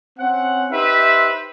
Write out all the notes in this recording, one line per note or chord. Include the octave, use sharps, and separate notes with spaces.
C4 C#4 F#5
D#4 G4 B4 C5 E5